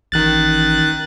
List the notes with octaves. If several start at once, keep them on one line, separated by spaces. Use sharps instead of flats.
A1 D#3 F#6 A6